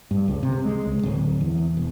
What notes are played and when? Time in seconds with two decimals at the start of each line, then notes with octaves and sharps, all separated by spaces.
0.11 G2
0.28 C#2
0.43 C3
0.65 G#3
0.86 C#2
1.03 D1
1.41 E2
1.77 E1